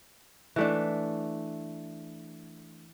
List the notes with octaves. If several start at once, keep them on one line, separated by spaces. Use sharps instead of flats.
E3 A3 D4